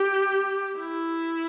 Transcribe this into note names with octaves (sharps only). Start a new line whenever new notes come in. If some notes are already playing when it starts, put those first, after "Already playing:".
Already playing: G4
E4